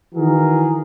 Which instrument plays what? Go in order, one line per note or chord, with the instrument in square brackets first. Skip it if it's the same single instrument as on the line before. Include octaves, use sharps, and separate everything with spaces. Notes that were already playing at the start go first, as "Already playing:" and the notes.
[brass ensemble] D#3 E3 F#4 G#4 A#4